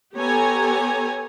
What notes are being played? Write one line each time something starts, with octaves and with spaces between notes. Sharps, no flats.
B3 G4 A4 C#5 G#5 A#5